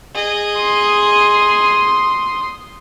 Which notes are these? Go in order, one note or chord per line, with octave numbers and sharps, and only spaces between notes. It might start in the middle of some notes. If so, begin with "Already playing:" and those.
G#4 D#5
C6 D#6